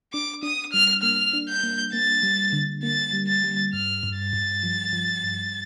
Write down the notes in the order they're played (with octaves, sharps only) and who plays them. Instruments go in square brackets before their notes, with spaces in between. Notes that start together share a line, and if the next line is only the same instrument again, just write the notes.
[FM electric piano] D4 [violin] D6
[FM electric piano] D4 [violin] D#6
[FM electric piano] G3 [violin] F6
[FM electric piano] A#3 [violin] F6
[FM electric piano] D4
[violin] G6
[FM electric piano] A#3
[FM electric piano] A#3 [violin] A6
[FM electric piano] G3
D3
[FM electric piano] A#3 [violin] A6
[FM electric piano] G3
[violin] A6
[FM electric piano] G3
[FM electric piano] G2 [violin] F6
[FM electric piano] G2
[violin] A6
[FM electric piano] G2
F3
F3
G2